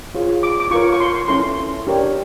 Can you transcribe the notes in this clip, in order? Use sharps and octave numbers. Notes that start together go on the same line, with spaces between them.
F4 G#4 C#5
D6
D6
F4 A#4 C#5 C#6
C#6
C6
C#4 E4 A4 C6
D4 G4 A#4 C#5